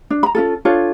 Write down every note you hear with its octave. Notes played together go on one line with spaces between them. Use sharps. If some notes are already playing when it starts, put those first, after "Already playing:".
D4
A#5 B5
C#4 F4 A4
D4 F4 A4 C#5